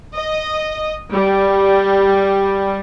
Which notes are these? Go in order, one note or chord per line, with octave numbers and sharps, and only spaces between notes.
D#5
G3